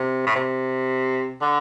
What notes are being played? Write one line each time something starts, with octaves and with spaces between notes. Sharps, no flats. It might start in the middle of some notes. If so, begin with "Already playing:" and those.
Already playing: C3
A2
C3
D3